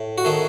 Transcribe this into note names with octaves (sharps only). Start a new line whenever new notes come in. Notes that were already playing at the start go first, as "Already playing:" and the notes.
Already playing: A2
F#4
D#3 A3 G#4